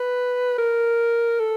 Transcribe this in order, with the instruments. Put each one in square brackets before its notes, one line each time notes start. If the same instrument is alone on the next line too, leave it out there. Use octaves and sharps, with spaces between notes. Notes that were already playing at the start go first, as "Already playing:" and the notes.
Already playing: [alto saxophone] B4
A#4
A4